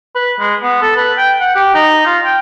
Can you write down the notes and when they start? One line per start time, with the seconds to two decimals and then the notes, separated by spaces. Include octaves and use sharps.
0.15 B4
0.39 G#3
0.62 B3
0.82 A4
0.96 B4
1.17 G5
1.40 F#5
1.55 G4
1.74 D#4
2.06 F4
2.24 G5